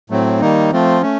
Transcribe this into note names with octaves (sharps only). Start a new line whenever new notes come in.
A2 F#3 A3 C4
D#3 G3 A#3 D#4
F3 A3 C4 F4
A3 C#4